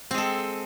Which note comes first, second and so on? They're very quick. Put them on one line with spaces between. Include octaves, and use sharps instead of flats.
C4 G#3 A4